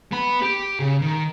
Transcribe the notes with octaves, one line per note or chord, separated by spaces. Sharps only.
B3 B5
G4
C#3
D#3